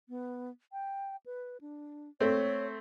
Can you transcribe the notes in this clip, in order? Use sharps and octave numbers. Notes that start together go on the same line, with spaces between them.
B3
G5
B4
D4
A3 C4 C#5